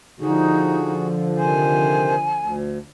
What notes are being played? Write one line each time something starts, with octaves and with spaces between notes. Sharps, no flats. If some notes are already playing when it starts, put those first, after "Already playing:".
D3 F3 D#4 F#4 G#4
C3 D#3 C5 G#5
D2